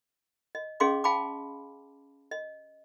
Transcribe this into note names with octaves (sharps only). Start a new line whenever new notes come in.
D#5
C#4 G#4 D#5 F5 C6 D6
F5 G5 A5 B5 D6
D#5